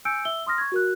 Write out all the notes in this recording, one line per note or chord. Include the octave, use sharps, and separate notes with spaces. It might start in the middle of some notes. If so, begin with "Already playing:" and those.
G#5 E6 G6 C#7 D7
E5 E6 G7
C6 D#6 F6 A#6
C#6 G#6
F#4 A#4 F#6